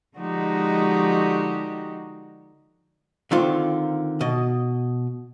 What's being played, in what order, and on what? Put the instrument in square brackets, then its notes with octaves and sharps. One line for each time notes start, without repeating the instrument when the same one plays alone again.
[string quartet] D3 F3 G#3 D#4 F#4 G4
[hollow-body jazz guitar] D3 D#3 C4 F4
B2 D#5